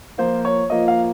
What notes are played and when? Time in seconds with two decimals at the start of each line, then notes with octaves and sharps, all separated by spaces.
0.18 F3 A#3 F4 C5
0.45 C#5
0.70 F3 A#3 F4 D#5
0.88 F5